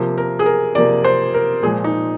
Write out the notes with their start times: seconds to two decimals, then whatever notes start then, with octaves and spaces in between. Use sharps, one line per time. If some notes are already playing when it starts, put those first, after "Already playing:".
Already playing: C3 F3 A#3
0.18 A#4
0.39 G#4
0.46 A#4
0.75 C3 F3 A#3 D5
1.04 C5
1.34 A#4
1.63 A#2 F3 G#3 G#4
1.84 D#4